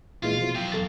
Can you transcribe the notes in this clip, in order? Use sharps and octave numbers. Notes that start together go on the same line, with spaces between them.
A#2 E3 G#3 F4
B2 F3
F#2 F5 G5
E2 A4 A6